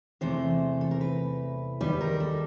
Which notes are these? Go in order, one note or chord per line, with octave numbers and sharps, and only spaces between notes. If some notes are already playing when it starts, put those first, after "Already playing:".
E2 C3 E3 A3 C5
A4
A#4
B4
D#2 D#3 G3 B4
A#4
A4